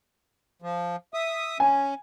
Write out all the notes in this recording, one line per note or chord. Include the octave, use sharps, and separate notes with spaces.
F3
E5 D#6
C#4 G#5